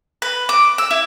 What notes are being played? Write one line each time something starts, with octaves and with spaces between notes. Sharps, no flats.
B4
D6
E6
E4